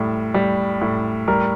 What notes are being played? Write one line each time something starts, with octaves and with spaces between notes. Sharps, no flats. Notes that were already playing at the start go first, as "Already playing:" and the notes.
Already playing: A2 G3
G3
A2
G3 A#4